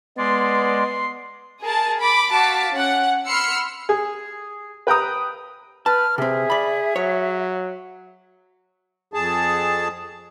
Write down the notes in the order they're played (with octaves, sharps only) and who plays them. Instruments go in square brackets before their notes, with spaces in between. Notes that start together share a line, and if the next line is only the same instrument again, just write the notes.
[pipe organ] G#3 D5 [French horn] B3 [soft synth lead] C6
[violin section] G#4 A#4 A5
B5 D6
F#4 F5 A5 D6 B6
C#4 F#5
B5 C6 E6 F6 C7 C#7
[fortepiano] G#4
B4 G5 A#5 D#6
[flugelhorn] B4 [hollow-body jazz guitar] A5 [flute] F6
[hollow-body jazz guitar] C3 C4 [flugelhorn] G#4 [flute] E5
[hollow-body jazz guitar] D5 B5
[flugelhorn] F#3 [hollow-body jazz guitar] C#5
[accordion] F2 G#4 A5